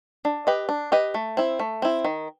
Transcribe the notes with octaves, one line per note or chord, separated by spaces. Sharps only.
D4
G4 B4 D#5
D4
G4 B4 D#5
A3
C4 E4
A3
C4 E4
D#3